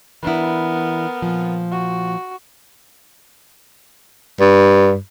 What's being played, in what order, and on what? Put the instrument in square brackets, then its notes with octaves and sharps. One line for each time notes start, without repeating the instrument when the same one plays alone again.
[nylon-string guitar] E3 D4 E4 [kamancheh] B3 A#4
[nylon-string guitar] A#2 F3
[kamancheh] F#4
[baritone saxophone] G2